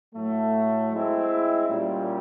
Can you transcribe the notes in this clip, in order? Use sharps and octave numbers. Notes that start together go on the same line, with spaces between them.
A2 F#3 A3
G#3 C4 E4
A#2 G3 A#3 C#4